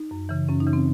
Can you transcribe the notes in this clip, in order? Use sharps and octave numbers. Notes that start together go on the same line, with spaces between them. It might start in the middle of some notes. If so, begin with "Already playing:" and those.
Already playing: D#4
F#2
C#3 E3
F#2 C#4
D#4
C#3 E3
C4